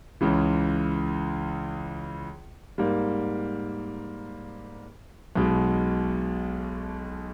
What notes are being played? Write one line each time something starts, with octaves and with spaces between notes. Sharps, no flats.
C#2 C#3 E3
G#2 G3 A#3
B1 B2 G#3